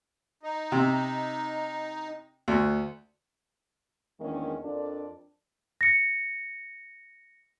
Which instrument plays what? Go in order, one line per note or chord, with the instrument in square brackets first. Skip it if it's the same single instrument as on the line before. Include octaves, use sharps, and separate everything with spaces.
[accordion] D#4
[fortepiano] C3
D2
[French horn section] E2 D#3 G#3 A#3 C#4 D4
F2 D4 F4 A4 A#4 D5
[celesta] A#6 C#7